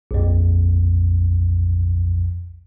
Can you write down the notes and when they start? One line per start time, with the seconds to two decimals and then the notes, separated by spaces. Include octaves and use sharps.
0.11 A#1 F2